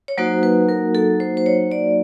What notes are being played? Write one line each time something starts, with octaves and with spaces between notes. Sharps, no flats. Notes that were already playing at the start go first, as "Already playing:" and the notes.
C#5
F#3 A#3 D#4 F#4 C5
B4
A#4
A4
C5
C5
C#5
D5